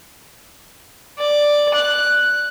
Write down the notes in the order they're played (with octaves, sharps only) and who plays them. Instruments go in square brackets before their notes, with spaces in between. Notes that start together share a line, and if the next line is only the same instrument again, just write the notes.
[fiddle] D5
F#6